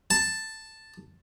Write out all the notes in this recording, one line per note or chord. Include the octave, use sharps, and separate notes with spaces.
A5